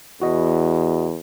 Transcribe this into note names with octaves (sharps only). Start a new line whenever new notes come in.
E2 F#4 D#5